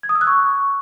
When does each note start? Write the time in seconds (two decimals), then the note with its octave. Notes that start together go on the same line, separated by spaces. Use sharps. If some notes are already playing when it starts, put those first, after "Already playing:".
0.03 G#6
0.09 D#6
0.15 E6
0.21 F#6
0.27 C#6